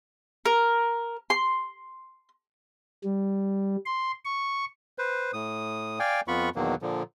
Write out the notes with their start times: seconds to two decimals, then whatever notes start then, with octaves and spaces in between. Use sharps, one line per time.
0.46 A#4
1.30 C6
3.04 G3
3.86 C6
4.25 C#6
4.98 B4 C5
5.33 A2 D#6
6.00 D5 F5 G5 G#5
6.28 F2 B3 F4 B5 C#6
6.56 E2 B2 D#3 F#3 A#3
6.82 A#2 D3 F3